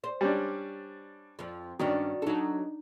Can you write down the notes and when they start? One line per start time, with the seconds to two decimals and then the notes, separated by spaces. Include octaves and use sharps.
0.04 C5
0.21 G3 C#4 D4
1.39 F2 F3
1.79 G2 D#3 C#4 D4 F#4 D5
2.22 F#3 D4 D#4 A4